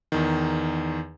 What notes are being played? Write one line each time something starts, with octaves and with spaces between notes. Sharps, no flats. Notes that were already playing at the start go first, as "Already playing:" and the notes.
E2 D#3